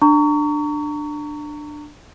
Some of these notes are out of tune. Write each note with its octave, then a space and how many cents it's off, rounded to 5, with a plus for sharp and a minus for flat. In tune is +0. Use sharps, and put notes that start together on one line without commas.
D4 +15 A#5 -30 C#6 +25